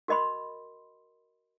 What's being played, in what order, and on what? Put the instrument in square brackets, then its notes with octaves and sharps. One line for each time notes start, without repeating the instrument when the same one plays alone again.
[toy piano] F#4 A#4 D#5 B5 C6